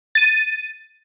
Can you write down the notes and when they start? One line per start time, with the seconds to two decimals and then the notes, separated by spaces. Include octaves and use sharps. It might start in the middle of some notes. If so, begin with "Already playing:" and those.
0.15 A6 D#7